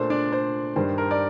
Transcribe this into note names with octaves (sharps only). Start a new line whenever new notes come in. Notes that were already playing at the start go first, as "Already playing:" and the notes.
Already playing: A#2 A3 D4 C5
D4 D5
C5
G2 D#3 G3 D4 C5
A#4
D5